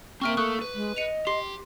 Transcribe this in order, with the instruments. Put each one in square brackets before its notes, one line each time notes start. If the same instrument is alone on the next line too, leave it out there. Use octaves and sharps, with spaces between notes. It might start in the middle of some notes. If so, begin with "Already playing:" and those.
[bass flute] A#3 [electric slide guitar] C4 E5 [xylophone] C#6 F6 D7
[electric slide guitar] A3 [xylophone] C#6 D#6 F#6
[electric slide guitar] B4
[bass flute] G#3
[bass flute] D#5 [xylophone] C#7 D#7 F7
[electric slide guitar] G4 [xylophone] C6 C7